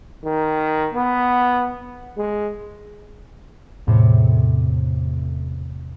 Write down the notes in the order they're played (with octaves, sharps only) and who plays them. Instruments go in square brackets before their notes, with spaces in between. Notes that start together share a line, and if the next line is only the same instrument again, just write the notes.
[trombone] D#3
B3
G#3
[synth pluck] E2 A2 C3